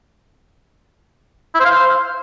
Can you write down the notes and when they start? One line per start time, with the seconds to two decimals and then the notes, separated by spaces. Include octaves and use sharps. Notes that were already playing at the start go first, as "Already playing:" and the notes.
1.54 E4
1.60 C5
1.65 F5
1.71 C5